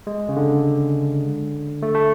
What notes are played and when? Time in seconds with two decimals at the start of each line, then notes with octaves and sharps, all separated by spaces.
0.07 G#3
0.29 C#3
0.36 D3
1.82 A3
1.95 A3